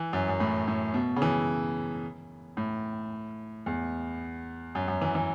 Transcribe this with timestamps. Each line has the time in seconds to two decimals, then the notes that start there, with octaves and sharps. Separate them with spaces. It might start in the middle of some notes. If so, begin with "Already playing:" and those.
Already playing: E3
0.13 F#2
0.29 F#2
0.40 A2
0.68 A2
0.94 B2
1.17 C#3
1.22 E3
2.57 A2
3.66 E2
4.75 F#2
4.88 F#2
5.02 E3
5.15 E3